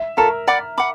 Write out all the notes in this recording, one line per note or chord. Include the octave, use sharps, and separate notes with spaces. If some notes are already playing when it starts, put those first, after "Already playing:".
Already playing: E5
F4 A4 A#4 C#5
D5 F#5 B5 D6
F#5 B5 D6